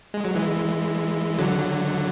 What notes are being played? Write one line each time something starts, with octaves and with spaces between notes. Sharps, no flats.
G#3
F#3
E3 G#3
D3 F#3